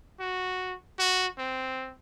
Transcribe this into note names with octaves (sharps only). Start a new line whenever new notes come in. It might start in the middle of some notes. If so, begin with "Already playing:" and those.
F#4
F#4
C4